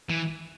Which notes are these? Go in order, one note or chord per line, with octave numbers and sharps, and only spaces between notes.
E3